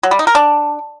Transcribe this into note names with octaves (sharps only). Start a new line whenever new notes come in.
F#3
G3
D#4
A#4
D4